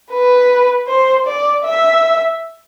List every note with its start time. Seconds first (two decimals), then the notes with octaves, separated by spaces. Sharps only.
0.12 B4
0.88 C5
1.26 D5
1.64 E5